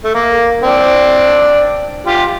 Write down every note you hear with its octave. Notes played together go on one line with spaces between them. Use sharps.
A3
A#3
C4 D4
F4 G4